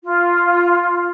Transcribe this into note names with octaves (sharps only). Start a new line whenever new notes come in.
F4